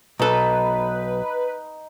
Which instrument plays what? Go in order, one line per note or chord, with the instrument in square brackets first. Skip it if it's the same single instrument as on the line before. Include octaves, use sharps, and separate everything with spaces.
[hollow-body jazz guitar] B1 A4 [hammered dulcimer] D#4 [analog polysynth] B4